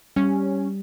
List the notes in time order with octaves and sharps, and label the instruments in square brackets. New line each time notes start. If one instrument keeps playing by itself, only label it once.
[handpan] G3 [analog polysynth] C#4